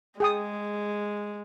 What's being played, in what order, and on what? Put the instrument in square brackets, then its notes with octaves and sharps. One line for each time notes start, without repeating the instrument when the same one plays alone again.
[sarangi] G#3 [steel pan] G#4 G5 D#6